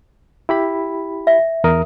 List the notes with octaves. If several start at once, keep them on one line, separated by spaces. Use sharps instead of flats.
E4 G4 B5
E5
E2 A#4 D#6